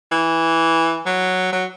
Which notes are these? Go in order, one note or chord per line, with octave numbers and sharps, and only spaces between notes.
E3
F#3
F#3